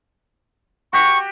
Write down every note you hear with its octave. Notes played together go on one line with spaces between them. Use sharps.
F#4 G4 C#6